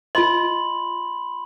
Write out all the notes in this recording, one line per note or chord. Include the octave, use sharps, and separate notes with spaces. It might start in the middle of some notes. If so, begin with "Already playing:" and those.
F4 D#5 B5 C6 F#7